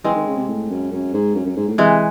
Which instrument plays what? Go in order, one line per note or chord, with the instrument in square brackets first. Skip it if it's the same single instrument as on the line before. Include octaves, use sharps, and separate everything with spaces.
[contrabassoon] E3 [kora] G#3 C4
[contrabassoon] D#3
C#3
C3
A2
F#2
F#2
G#2
F#2
F#2
G#2
A2
[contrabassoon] C3 [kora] E3 G#3